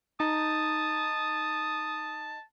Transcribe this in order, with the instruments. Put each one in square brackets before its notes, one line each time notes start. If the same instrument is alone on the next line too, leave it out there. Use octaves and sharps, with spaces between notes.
[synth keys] D#4 [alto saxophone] A5 [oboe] D#6